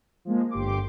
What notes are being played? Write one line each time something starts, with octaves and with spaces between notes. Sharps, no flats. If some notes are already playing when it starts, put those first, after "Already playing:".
F3 G#3 A#3
G1 G4 C6 D6